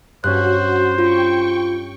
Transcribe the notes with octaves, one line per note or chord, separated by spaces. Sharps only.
G2 C#4 F#4 C5 F#6
F4 G5 C#6